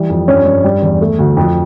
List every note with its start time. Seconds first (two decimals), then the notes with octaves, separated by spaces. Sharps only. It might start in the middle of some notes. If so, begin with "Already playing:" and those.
Already playing: E3 G3
0.10 F2
0.28 G2 C#4
0.45 G2
0.64 G3
0.82 E2
1.01 A3
1.19 D2
1.37 F2